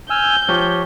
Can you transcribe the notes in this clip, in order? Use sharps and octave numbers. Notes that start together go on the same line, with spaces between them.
G#5 E6 F6 G6
F3 G4 C#5